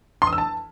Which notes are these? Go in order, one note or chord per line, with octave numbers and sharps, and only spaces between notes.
C6
D#6
E6
A5